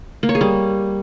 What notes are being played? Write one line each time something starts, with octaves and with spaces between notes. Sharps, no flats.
A#3
C#5
G#4
G3